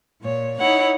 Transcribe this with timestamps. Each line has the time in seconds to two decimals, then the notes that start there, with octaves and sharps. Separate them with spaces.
0.21 A#2 C#5
0.59 D#4 E4 C#5 F#5